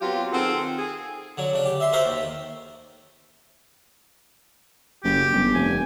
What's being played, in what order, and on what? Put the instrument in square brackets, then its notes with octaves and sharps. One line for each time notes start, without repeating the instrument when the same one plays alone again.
[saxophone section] F#3 B3 C4 F4 G4
D#3 C4 F4 G#4 A4 F#5
G#4
[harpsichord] D3 F#3
C#3 D4
G4
E5 C6
F#4 A4 A#4 C5 E5 G5
D#2
[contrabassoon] F#1 [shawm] G4
[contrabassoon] G1
[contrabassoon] F1 [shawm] G#5